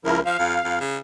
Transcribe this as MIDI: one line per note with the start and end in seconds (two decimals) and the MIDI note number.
0.05 0.20 37
0.05 0.20 53
0.05 0.20 64
0.05 0.20 70
0.26 0.36 53
0.26 0.79 77
0.39 0.59 41
0.65 0.76 41
0.80 0.97 49